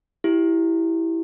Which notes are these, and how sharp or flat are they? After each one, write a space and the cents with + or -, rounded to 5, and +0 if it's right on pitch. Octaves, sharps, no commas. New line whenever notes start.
E4 +0 G4 -15